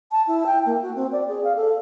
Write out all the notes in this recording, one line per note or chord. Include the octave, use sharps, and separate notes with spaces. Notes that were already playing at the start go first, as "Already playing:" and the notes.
A5
E4
G5
A#3
F#4
C4
D5
G#4
F5
A4